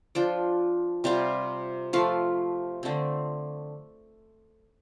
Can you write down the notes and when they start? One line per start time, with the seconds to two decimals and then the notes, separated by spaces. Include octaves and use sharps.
0.15 F3 D4 F4 G5
1.04 C3 G3 C4 F4
1.93 F3 A3 F4 F5
2.83 D3 A3 C4